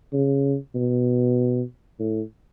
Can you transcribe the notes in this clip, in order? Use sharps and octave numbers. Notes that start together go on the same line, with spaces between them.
C#3
B2
A2